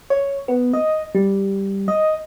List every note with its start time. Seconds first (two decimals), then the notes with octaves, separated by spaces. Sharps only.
0.10 C#5
0.48 B3
0.73 D#5
1.15 G3
1.88 D#5